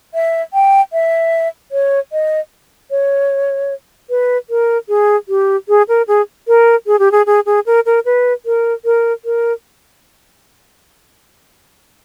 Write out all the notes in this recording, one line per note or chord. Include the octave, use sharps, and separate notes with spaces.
E5
G5
E5
C#5
D#5
C#5
B4
A#4
G#4
G4
G#4
A#4
G#4
A#4
G#4
G4
G#4
G#4
G#4
A#4
A#4
B4
A#4
A#4
A#4